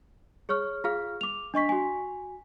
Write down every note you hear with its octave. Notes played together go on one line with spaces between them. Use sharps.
G#4 C#5 C#6 F6
F4 G#4 F5 F6
D6 F7
D4 D#5 C#6 B6
F#4 G#5